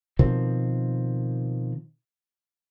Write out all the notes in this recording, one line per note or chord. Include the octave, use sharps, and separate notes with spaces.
B2 D#3 F3 C4